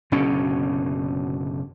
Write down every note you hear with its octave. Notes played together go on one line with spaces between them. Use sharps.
F#1 B2 D3 C#4